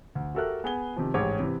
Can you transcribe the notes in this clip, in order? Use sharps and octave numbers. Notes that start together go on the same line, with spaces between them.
D2
F#4 G4 A4 A#4 E5 F#6
B3 G#4 G#5 G7
C3 D#3 F3
A1 G#2 G4 C#5 D6
C3 E3